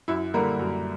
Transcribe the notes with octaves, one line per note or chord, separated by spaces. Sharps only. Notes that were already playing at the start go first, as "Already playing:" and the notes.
F#2 E4
D3 G3 A#3 A#4
F#2